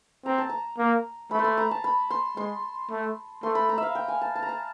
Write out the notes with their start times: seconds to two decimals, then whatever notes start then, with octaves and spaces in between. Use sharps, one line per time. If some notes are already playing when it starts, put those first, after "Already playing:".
0.26 C4 A#5
0.38 A5
0.49 A#5
0.78 A#3
1.31 A3 B5
1.39 C6
1.44 B5
1.58 A#5
1.71 A5
1.84 B5
2.10 C6
2.37 G#3 C6
2.90 A3
3.43 A3 C6
3.55 B5
3.69 A#5
3.78 E5 F5
3.95 G5
4.08 G#5
4.22 A5
4.35 A5
4.43 A#5
4.49 A5